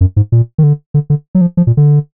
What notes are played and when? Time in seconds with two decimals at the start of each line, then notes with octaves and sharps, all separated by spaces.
0.01 F#2
0.16 G#2
0.32 A#2
0.58 D#3
0.63 D3
0.94 D3
1.10 D3
1.35 F#3
1.41 F3
1.57 F3
1.67 A#2
1.77 D3